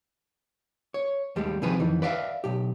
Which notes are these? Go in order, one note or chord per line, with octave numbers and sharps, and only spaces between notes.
C#5
D#2 G3 G#3 G4
C3 D#3 F3 G#4 B4
F2 D#3 E3
B4 D5 E5 F5
B1 G4